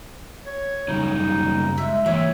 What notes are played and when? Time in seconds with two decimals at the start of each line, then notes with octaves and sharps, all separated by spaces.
0.45 C#5
0.88 F#2 C#3 G3 D#4
1.78 G#3 E5
2.06 E3 A#3 C#5 E5